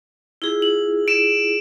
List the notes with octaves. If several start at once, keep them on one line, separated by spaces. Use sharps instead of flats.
E4 F4 G#4
F#7
D7 E7